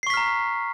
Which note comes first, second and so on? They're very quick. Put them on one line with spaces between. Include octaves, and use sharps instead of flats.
C7 C#6 B6 F6 A#5